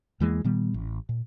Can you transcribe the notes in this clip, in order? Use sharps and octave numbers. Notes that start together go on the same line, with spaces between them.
E2 E3 G#3 A#3
A#2 D#3 G3 B3
A1
A#2